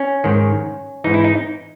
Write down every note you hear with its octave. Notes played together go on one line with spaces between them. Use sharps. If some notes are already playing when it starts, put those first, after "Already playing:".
Already playing: C#4
G#2 D#3
G#2 E3 D#4
E4
D#4